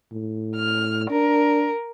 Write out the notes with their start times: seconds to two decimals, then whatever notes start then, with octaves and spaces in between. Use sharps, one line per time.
0.12 A2
0.56 F6
1.10 D4 A#4